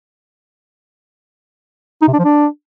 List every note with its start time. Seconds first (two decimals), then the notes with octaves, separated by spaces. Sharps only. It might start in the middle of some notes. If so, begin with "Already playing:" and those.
2.02 D#4
2.08 C3
2.13 D4
2.19 F3
2.24 D4